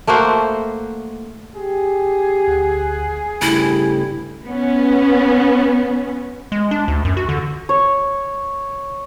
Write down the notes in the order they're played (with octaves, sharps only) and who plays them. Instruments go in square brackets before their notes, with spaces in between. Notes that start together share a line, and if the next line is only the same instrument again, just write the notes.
[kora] A3 A#3 F#4 C5
[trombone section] G4 [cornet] G#4
[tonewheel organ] D2 F#5
[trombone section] G2 [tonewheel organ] C#3 A3 G4 [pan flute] E4
[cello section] B3 C#4
[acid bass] G#3
D4
D2
F#2
F#4
D3
[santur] C#5